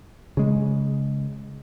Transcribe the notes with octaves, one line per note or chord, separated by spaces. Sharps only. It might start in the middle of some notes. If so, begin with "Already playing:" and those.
C#3 G#3